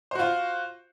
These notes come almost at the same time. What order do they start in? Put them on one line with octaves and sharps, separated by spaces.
C5 F#4 F4